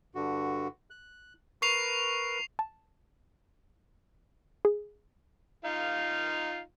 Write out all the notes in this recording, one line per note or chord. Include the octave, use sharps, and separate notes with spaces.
G2 D3 F#4
F#6
A#4 B4 C#6 C7 F7
A5
G#4
D#4 F4 F5